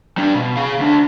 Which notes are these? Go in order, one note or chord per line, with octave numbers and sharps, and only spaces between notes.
G3 D4
B2
G#4 F5
D2 D4